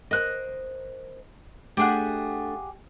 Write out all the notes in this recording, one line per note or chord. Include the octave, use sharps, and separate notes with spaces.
A#4 C5 D#5 F#6
A3 D4 G4 G#4 F#5